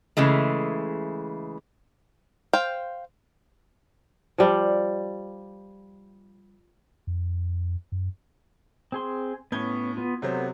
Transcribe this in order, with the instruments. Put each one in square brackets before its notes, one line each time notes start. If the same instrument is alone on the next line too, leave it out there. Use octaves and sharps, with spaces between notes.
[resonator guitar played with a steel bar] C#3 E3 G#3 A3
[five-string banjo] C5 F5 G5
[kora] F3 G3
[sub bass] F2
F#2
[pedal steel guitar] C4 G#4 C6
[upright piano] A2 G#6 G7 [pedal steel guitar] B3 C#4
[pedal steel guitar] B3 F4
[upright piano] C3 F#3 C5 [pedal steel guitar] B3 A4 G6